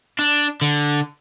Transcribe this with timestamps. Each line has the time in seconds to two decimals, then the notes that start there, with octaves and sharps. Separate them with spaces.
0.19 D4
0.61 D3